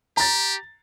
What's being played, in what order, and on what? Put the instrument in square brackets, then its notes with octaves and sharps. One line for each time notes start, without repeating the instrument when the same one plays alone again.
[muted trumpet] G4 [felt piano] A#5 A6